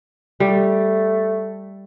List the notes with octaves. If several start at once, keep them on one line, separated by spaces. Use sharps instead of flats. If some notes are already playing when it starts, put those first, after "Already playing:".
G3 A3